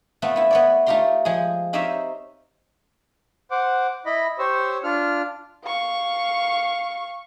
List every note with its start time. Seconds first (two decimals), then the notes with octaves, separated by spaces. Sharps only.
0.22 A3 B3 C4 F4
0.36 B3 E4
0.51 B3 C#5 D5
0.86 A3 D#4 F4 G4 A#5 C6
1.25 F3 G#3 G#4
1.73 C4 D#4 G4 C#5 E5 F5
3.51 C5 F#5 D6
4.06 E4 D#5 B5
4.39 G4 C5 C#5 E6
4.84 D4 F4 F6
5.65 F5 C#6